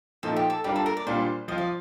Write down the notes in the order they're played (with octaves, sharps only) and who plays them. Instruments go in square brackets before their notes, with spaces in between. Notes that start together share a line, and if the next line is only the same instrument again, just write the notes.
[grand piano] A#2 F3 A3 D#4 [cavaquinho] A4
[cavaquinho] G4
A4
[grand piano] G3 D4 F4 A#4 [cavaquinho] G4
[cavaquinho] A4
A#4
D5
[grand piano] A#2 G3 D4 F4 [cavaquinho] C5
[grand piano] F3 C4 F4 [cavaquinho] D#5
[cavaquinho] D5